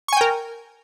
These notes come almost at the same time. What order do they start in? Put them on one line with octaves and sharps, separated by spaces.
C#6 G#5 G5 A#4